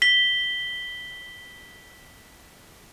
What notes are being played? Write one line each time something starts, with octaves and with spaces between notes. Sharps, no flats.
B6 G7